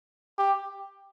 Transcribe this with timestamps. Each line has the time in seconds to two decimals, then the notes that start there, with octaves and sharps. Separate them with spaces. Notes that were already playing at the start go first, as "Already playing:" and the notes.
0.38 G4